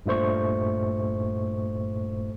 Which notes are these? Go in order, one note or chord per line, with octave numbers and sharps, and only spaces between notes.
G2 A#2 A3 C5 C#6